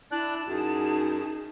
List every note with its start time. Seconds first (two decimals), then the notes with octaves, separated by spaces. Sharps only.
0.12 D4 E4 D5 A5 F#6
0.48 F#2 D#4 F#4 G#4